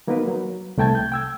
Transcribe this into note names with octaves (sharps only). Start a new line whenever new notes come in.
F#3 A#3 B3 D#4 A#4 B4
F#3
C2 A3 G5 A5 G#6
G6
G5 E6 G#6